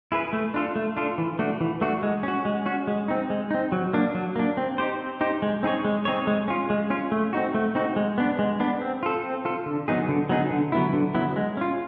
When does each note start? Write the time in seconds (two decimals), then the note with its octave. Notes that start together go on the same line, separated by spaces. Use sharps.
0.12 E4 G#4 B4
0.33 A3
0.54 D4 F4 A4
0.76 A3
0.97 D4 F4 A4
1.18 E3
1.39 A3 D4 F#4
1.61 E3
1.81 A3 D4 F#4
2.03 G#3
2.23 C#4 F#4
2.45 G#3
2.66 C#4 F#4
2.87 G#3
3.08 C4 D#4
3.30 G#3
3.51 C4 D#4
3.72 F#3
3.93 A#3 D4
4.15 F#3
4.36 A#3 D4
4.57 C4
4.78 D#4 G4 C5
5.00 C4
5.21 D#4 G4 C5
5.42 G#3
5.63 C4 D#4 G#4 C#5
5.85 G#3
6.05 C4 D#4 G#4 C#5
6.27 G#3
6.48 C#4 F4
6.70 G#3
6.90 C#4 F4
7.12 A3
7.33 C4 D#4 F#4
7.54 A3
7.75 C4 D#4 F#4
7.96 G#3
8.18 B3 D4
8.39 G#3
8.60 B3 D4
8.81 C4
9.03 F4 A4
9.23 C4
9.45 F4 A4
9.66 D3
9.88 F#3 B3 D#4 G#4
10.08 D3
10.29 F#3 B3 D#4 G#4
10.51 D3
10.72 F#3 B3 E4
10.93 D3
11.15 F#3 B3 E4
11.36 G#3
11.57 C#4 F4